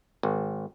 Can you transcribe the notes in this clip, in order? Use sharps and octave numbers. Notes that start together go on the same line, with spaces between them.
G#1